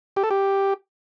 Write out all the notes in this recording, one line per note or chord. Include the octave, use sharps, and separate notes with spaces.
G4
A4
G4